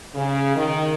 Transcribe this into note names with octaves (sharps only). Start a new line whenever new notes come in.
C#3
D#3